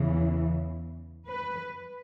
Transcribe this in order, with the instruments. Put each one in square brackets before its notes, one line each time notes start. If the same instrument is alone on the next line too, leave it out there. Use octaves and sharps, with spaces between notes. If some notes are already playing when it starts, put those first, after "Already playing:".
Already playing: [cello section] E2 C#3 E3
B4